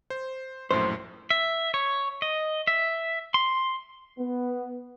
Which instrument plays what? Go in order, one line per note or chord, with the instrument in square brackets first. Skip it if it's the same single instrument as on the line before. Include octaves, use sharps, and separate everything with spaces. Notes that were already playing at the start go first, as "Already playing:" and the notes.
[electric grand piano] C5
[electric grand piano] A#1 F#2 A2 [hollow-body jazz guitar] C5
[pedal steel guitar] E5
C#5
D#5
E5
C6
[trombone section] B3